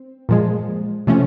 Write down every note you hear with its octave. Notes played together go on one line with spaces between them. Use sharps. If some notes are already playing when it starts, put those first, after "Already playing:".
Already playing: C4
A#2 F3 G#3
C3 F3 A3 C#4